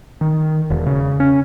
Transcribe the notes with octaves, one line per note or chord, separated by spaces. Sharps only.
D#3
E1
C#3
C#4